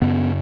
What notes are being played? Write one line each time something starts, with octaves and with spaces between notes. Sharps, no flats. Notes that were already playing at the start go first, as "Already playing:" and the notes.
F#2 C#3 B3